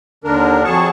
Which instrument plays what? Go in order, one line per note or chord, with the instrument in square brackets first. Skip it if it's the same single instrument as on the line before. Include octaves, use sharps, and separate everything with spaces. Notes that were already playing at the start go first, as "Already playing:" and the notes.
[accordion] D#2 D3 D4 A#4
F2 F#3 G#4 A5 C#6